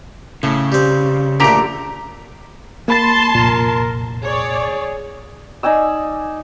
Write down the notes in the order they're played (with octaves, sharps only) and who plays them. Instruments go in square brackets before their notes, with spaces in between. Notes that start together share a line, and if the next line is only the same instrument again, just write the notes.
[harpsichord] A2 [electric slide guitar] C#3
[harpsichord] G3 C4
[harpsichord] A#1 A3 [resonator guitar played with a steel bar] D3 G4 A#5
[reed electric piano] A#3 B5 A6 [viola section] A5 C6
[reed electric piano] C2 F2 A#2 [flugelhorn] A#4
[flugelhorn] G#4 [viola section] C#5 D5
[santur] D#4 D5 G#5 E6